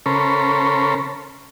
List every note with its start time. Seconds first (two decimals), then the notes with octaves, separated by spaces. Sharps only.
0.06 C#3 C#4 A4 A#4 C5 B5